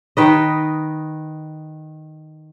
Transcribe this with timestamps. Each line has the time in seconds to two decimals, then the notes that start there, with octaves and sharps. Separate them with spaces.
0.17 D#3 B4 D#5